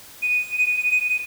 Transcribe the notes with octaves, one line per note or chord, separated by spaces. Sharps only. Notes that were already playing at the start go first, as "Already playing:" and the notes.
D#7